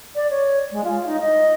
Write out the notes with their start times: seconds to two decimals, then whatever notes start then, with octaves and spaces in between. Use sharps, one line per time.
0.15 D5
0.31 C#5
0.72 G#3
0.84 F4
1.06 D#4
1.21 D#5